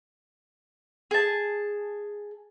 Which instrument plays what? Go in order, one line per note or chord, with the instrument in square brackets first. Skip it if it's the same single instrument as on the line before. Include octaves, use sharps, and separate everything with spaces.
[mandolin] G#4 A5